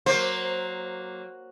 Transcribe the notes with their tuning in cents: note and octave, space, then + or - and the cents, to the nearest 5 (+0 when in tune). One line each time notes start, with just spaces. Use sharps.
F#3 +0 A#3 +0 C5 +10